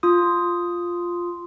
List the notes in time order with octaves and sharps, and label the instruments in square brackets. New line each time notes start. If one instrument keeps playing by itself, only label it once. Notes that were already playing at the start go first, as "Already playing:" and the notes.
[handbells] F4 D#6